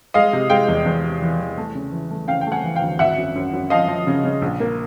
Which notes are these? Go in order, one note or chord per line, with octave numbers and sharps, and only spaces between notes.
G#3 D#5 F5
C3
G#3 F5 G5
E2
E2
C3
E3
E3
A3
C#3
E3
A3
C#3 F5 G5
G5
A3
F#5 G#5
E3
F5 G5
D2
G#1 E5 F#5
F#2
F#2
F#2
F3 D#5 F5
F3
C#3
C#3
A#1
A#3